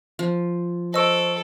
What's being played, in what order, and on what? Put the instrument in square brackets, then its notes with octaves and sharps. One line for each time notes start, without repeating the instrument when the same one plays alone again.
[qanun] F3
[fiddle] A4 [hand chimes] C5 C#6 D7 [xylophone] D#5 E6